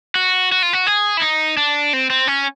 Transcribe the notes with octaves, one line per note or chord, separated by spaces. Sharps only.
F#4
F#4
F4
F#4
G#4
E4
D#4
D4
C4
C4
C#4